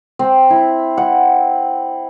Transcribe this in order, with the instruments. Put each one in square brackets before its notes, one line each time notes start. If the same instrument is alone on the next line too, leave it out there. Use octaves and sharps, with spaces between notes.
[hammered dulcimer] C4
E4
F#5